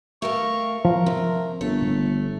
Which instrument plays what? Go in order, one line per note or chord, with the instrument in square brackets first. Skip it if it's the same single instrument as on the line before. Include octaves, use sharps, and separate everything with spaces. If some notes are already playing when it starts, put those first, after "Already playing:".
[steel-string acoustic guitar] A3 A#4 F5 [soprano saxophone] C#6
[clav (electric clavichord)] F3 [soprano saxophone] A#4
[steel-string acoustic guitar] C3
[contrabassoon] G1 [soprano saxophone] A3 [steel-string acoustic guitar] C#5